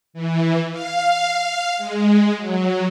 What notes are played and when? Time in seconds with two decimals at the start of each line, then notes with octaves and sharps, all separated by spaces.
0.13 E3
0.71 F5
1.77 G#3
2.36 F#3